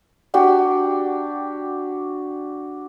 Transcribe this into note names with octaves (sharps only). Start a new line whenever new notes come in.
D4 F#4 G4 G5